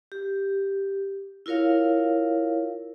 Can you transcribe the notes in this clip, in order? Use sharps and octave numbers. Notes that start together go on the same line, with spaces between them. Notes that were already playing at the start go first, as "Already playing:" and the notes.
G4
E4 F4 A#4 C#5 F5